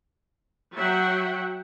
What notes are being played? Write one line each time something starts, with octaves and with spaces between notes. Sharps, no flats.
F#3 E5 F#5 G5